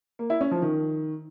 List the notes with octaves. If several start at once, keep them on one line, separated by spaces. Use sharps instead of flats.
A#3
E4
C#4
F3
D#3